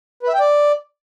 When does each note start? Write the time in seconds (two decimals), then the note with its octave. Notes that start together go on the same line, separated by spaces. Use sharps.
0.23 B4
0.29 E5
0.34 G5
0.40 D5